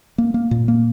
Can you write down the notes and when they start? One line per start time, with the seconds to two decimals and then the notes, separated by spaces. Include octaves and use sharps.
0.18 A#3
0.34 A#3
0.51 A#2
0.68 A#3